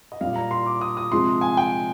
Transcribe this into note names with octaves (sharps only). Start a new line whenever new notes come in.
D#5
A#2 G3 F5
A#5
C6
D6
D#6
D#6
C3 F3 G#3 C6
G#5
G5